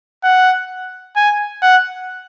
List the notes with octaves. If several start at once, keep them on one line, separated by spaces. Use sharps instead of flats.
F#5
G#5
F#5